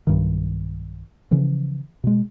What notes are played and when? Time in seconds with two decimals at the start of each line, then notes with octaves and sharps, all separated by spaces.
0.07 B1 G2 D#3
1.31 C#3 E3 F3
2.04 B2 G#3